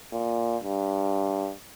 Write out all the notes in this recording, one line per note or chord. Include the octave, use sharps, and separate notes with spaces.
A#2
G2